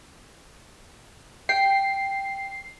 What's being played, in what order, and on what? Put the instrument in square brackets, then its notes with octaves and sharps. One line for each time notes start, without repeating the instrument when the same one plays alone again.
[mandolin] G5 [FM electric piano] C7